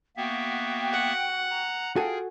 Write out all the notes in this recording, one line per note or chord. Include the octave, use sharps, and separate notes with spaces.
A#3 B3 F#4 E5 G5
F#5
A#5
F4 F#4 G#4 A4 G5 G#5